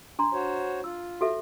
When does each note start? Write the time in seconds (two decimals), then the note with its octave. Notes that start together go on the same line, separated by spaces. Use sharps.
0.19 D4 A#5 C6
0.33 F#4 C5 C#5
0.84 F4 E6
1.21 F#4 A4 E5